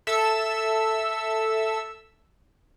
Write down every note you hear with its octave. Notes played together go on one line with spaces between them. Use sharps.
A4 E5 E6